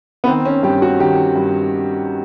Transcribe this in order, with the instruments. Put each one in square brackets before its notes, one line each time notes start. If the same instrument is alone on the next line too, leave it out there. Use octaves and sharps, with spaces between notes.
[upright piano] B3
D#3 C4
C#4
G2 G4
F#4
D#3 G4
G2